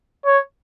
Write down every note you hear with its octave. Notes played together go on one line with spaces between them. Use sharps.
C#5